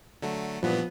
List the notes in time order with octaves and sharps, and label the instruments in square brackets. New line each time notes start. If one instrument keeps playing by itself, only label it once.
[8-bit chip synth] D3 F#3 A3
[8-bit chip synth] G2 A#2 E3 [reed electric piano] F3 [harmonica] B3